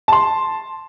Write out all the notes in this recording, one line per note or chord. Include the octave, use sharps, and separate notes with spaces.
A5 C6